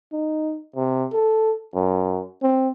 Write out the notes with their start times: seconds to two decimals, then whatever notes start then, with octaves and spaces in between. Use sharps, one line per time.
0.12 D#4
0.76 C3
1.13 A4
1.75 F#2
2.43 C4